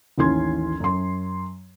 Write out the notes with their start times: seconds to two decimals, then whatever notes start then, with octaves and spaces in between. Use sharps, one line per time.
0.18 A1 D#2 E3 C#4 C6 G#6
0.80 F#2 C6